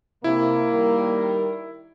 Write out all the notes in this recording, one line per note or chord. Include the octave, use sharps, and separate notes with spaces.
C3 A#3 E4
D#3 G3 A#4